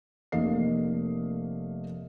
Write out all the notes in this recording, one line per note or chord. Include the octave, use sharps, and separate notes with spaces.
F1 A3 A#3 D#5 F5 C7